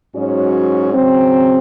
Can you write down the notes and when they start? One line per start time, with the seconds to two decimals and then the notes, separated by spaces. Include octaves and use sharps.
0.14 G#2 F#3 C#4 F#4 C#5
0.94 C#3 F#3 C4